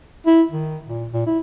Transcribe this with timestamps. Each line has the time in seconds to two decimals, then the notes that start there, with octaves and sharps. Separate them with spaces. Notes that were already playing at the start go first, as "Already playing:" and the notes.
0.26 E4
0.51 D#3
0.86 A#2
1.13 A#2
1.26 E4